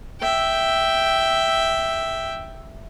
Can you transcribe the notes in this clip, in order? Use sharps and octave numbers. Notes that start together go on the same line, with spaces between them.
E5 G5